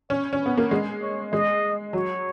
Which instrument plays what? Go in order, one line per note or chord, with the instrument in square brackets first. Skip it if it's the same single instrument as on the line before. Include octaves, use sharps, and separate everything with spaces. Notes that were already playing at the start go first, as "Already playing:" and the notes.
[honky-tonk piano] C#4 [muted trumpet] C#5
[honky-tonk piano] C#4
[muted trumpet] B4
[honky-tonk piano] B3
A#3
G#3
[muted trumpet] C#5
[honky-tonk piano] G#3 [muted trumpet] D#5
[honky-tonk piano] F#3 [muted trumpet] C#5